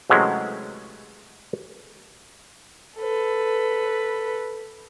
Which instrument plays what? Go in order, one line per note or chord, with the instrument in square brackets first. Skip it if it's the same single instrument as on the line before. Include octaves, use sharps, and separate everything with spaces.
[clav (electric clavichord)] C3 E3 F#3 G#3 A3 C#4
[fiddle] A4 B4